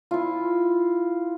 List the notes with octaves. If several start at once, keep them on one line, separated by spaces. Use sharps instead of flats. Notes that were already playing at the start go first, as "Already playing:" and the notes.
E4 F4